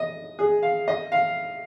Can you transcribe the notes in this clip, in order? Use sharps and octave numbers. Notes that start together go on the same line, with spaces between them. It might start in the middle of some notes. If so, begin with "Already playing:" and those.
Already playing: D#5
G#4
F5
D#5
F5